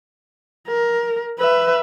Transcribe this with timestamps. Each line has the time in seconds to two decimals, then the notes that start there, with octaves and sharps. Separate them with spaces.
0.68 A#4
1.39 B4 E5